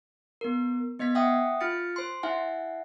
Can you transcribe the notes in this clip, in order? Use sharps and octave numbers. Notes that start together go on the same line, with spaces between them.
B3 A#4
B3 D#5 G#6 B6
E5 F#5 G5 D#6
F4 F6 A6 C#7
C5 C6
E4 E5 F#5 G#5